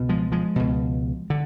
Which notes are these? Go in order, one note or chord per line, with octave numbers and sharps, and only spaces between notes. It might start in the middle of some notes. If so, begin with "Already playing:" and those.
Already playing: C#2 B2
F3 G#3
F3 G#3
C#2 B2
D3